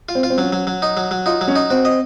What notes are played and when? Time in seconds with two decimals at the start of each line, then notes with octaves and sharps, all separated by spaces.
0.09 F4
0.15 C4
0.23 F4
0.30 C4
0.37 F#3 C#4
0.53 F#3
0.67 F#3
0.82 D#4
0.97 F#3
1.11 F#3
1.26 D#4 F4
1.41 F#3
1.48 C#4
1.55 D#4
1.70 C4 F#4
1.85 D#5